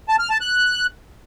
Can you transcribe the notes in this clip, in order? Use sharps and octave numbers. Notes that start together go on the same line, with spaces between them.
A5
F6
A5
F#6